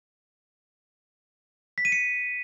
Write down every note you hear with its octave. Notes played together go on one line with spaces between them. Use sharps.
B6
D#7
C#7